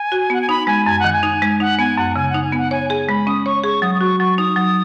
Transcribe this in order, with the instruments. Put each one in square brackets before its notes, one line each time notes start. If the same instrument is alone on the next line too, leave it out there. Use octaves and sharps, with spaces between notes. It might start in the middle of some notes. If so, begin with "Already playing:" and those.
Already playing: [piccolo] G#5
[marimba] F#4
[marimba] B3 [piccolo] F#5
[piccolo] G#5
[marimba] D#4 [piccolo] B5
[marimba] G#3 [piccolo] G#5
[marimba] F#2 [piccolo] G#5
[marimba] D#3 [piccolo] F#5
[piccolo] G#5
[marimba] D#4
G#3
[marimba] D#4 [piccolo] F#5
[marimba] B3 [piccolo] G#5
[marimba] F#2 [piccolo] F#5
[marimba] C#3 [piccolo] G#5
[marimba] D#4 [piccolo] F#5
[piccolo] G#5
[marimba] B3
[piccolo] F#5
[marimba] C#5 [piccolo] G#5
[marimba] G#4 [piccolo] G#5
[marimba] G#3 [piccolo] B5
[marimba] C#4 [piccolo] D#6
[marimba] C#5 [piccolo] C#6
[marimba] G#4 [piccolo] C#6
[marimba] F#3 [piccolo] D#6
[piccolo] D#6
[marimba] F#4 [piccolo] C#6
[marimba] F#3 [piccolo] C#6
[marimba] D#4 [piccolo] D#6
[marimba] F#3